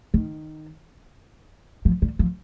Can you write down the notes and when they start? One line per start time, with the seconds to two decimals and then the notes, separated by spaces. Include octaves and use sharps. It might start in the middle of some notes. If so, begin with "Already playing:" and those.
0.14 D#3
1.85 F3
2.02 G3
2.19 F3